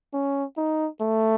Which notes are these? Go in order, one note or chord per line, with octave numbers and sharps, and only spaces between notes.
C#4
D#4
A3